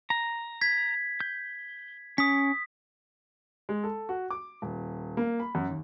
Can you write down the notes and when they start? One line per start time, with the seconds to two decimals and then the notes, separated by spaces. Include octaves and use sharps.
0.10 A#5
0.61 G#6 B6
1.20 G6
2.18 C#4 D#6 B6
3.69 G#3
3.84 A4
4.09 F#4
4.30 D6
4.62 D#1
5.17 A#3
5.40 B5
5.55 F#2
5.69 D#2